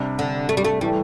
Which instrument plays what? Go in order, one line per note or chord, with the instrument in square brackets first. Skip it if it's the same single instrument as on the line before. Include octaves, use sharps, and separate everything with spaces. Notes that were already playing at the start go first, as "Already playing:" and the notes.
Already playing: [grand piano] C3 G3 D4
[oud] D3
A3
G3
A3
[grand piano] A2 E3 A3 [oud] G3